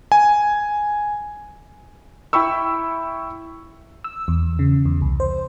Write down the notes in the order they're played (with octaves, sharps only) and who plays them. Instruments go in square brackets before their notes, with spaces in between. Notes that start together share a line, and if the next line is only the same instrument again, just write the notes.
[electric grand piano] G#5
E4 G5 B5 C#6 E6
[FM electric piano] E6
E2
C#3
E2
C2
C5